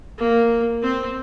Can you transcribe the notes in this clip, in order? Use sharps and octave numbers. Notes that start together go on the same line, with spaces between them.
A#3
C4